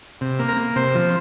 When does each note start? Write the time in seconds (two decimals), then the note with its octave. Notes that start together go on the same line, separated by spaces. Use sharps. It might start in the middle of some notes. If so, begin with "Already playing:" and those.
0.21 C3
0.39 A#3
0.48 A#4
0.57 A#3
0.76 C3 C5
0.95 F3